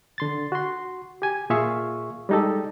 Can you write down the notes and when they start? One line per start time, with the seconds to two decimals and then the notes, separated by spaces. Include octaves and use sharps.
0.18 D3 C6 A6
0.52 F#4 C6
1.22 G4 G#5
1.50 A#2 F4 G#4 E5 F5 C#6
2.29 G3 G#3 D#4 G4 A4